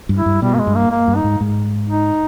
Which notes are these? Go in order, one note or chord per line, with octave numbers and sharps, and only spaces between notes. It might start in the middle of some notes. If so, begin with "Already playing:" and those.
G2
E4
G2
B2 G3
A#3
G#3
G2
A#3
A#3
G2
D#4
G#2
G#2
D#4